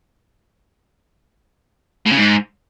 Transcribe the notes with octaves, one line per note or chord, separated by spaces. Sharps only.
A2
C#3
G#2